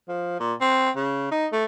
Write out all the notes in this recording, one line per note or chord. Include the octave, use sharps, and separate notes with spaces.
F3
A#2
C4
C#3
D#4
A3